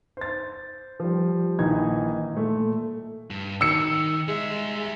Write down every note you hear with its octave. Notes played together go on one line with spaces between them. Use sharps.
C5 A6
F3 G3
A#1 D#3 E3 D#4 G#6
A#2 A3
G2
D#3 E6 C#7
G3 G#3 E5